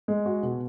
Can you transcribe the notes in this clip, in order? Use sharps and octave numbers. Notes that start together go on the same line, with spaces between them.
G#3
F#4
B2